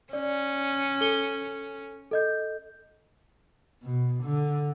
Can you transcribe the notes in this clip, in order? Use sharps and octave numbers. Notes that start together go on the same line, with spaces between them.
C#4 D5
A4 G7
A4 D#5 G6
B2
D3